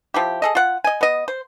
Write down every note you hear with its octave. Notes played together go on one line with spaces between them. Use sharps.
F3 E4 G4
G#4 A4 D#5
F4 F#5
D#5 G#5
B3 D#5
C5